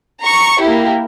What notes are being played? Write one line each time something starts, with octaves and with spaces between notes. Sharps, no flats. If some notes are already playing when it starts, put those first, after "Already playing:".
A#5 C#6
A#3 E4 G4